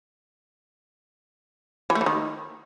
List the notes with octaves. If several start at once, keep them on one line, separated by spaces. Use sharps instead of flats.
E3
A3
E3
D#3